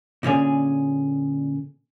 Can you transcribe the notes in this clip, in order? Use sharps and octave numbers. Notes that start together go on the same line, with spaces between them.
A#2 D3 C#4 G#4